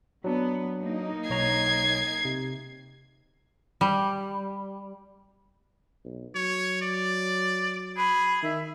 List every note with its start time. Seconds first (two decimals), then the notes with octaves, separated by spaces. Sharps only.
0.24 F#3 B3 D4
0.81 A#3 D#4
1.30 B1 C#5 A#5 G#6 C7
2.25 C3
3.81 G3
6.05 B1
6.35 F#3 C#5
6.82 D5
7.97 G#4 B5
8.43 D#3 E5